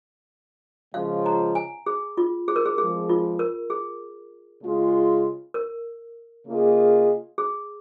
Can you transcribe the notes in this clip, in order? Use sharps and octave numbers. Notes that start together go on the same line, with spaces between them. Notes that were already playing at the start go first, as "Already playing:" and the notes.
C#3 F3 G#3 C#4 F4 F5
A#5
G#5
G#4
F4
G#4
A#4
G#4
F2 F3 G#3 G#4
F4
A#4
G#4
C#3 G#3 F4
A#4
C#3 A#3 F4 G#4 D#5
G#4